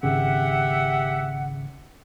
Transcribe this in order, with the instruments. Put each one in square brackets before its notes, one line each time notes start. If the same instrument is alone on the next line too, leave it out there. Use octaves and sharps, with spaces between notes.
[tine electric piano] G#1 C#3 [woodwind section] G4 E5 F#5